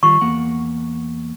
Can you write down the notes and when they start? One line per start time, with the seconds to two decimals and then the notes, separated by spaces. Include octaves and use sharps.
0.03 D#3 G3 F4 C#6
0.21 E2 A#3 F#5